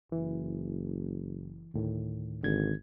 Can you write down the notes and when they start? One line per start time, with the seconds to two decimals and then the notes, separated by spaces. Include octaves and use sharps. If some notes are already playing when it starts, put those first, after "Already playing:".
0.12 F#1 E3
1.74 D2 A2 D#3
2.43 G#1 D3 G#6